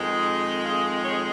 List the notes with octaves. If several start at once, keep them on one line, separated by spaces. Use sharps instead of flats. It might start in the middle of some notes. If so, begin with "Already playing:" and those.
Already playing: F2 D#3 G#3
F5
C#5